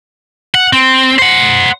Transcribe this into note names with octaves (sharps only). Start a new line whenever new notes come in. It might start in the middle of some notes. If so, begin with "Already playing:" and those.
F#5
C4
C5 F#5